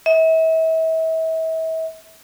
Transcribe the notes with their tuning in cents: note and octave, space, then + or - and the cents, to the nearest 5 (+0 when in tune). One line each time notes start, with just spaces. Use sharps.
E5 -35